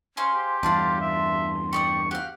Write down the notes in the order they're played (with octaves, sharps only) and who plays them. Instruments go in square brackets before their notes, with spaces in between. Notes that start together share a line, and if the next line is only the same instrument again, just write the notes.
[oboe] C#4 [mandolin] G#4 C5 F5
[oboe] G4 [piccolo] C6
[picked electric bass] E2 G2 [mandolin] D4 F4 F5
[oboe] E5
[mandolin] G4 D5 D#6 [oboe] C#6
[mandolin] G4 F5 [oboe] F#5